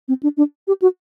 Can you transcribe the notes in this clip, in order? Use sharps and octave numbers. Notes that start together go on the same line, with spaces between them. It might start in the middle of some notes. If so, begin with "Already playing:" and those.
C4
D4
D4
G4
F#4